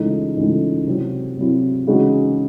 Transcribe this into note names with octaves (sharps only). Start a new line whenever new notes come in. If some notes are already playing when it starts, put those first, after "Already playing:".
Already playing: C#2 C#3 E3 A3 D#4
C#2 C#3 E3 A3 D#4
C3 F#3 C4 E4
C3 F#3 C4 E4
C#3 E3 G#3 D#4 F#4